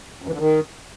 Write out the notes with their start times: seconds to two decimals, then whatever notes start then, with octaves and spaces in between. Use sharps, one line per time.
0.22 F#2
0.28 E3
0.34 D3
0.39 D#3